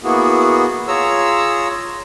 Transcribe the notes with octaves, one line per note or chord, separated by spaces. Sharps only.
A#3 B3 E4 F#4 G#4
F4 G#4 C#5 A#5 E6